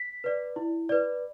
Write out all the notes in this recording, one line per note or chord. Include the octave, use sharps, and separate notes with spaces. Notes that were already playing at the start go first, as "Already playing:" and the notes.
Already playing: B6
B4 D5
E4
B4 D5